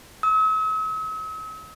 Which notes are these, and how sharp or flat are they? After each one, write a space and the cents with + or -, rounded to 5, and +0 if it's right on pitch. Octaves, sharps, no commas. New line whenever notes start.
E6 -45